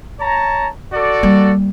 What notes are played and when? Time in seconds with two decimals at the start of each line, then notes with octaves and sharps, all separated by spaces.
0.20 C#5 A5 A#5
0.93 F#4 A4 D5
1.23 G3 A#3